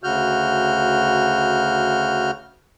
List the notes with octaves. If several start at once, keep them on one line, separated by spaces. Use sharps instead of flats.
D2 C#3 F#4 F6 G6